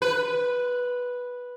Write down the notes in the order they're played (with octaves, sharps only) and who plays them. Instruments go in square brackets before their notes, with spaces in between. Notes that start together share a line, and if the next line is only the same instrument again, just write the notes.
[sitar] B4